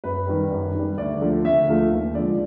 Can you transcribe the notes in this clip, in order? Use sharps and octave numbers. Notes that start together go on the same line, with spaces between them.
F#2 B4
D#3 G3
F#2
D#3 G3
D2 D5
D3 F3 A3
D2 E5
D3 F3 A3 F5
D#2
D3 F3 G#3 D5